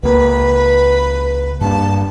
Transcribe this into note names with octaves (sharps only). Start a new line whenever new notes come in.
C#2 A#3 B4
G2 A#3 D4 A5